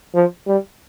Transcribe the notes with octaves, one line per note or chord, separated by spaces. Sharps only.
F3
G3